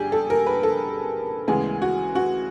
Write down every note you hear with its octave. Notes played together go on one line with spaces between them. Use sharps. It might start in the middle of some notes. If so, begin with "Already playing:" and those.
Already playing: G1 G2 D3 G4 G#4
A4
A#4
B4
A4
D2 C#3 E3 G#3 B3 G#4
F#4
F#4